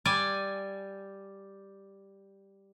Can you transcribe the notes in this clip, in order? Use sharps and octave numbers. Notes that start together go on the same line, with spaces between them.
G3 D5 G#5